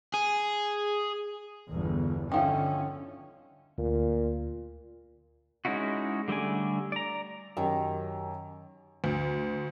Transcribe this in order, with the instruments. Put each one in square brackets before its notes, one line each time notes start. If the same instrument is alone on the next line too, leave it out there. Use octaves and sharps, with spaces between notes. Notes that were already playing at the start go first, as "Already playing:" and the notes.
[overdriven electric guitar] G#4
[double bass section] G1 E2
[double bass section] D3 C#4 [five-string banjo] D#3 F3 E4
[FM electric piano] D2 [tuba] A#2
[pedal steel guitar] G#3 C#4 D#4 E4 F#4
D3 G3 A3 D5 G#5
D5 A#5
[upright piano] F#2 G4 [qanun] D#3
[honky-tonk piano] D2